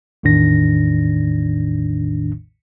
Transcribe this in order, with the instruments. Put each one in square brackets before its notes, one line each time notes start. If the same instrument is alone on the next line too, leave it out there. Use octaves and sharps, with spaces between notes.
[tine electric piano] A1 E2 A2 D#3 D4 A#6